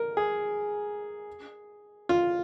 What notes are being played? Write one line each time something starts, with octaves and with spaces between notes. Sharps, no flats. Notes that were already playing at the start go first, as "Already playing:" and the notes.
Already playing: A#4
G#4
F4